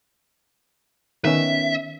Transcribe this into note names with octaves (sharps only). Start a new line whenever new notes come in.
D#3 B3 C#4 E5